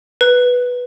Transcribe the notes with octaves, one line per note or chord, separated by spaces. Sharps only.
B4